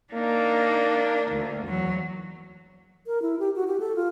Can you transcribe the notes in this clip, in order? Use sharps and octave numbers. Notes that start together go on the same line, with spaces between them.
A#3 D4 D#4
D2
E2 F#3
A#4
E4
G4
F#4
G4
A4
F4